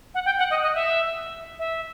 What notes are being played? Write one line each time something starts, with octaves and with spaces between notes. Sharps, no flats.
F#5
G5
F#5
D#5
D#5
E5
E5